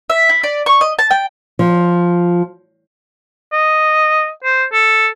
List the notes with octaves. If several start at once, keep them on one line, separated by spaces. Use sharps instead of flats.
E5
E4
D5
C#6
D#5
A5
G5
F3
D#5
C5
A4